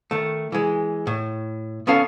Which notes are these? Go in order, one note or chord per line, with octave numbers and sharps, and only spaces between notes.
D#3 A3
E3 G#3
A2
B3 C#4 A4 F5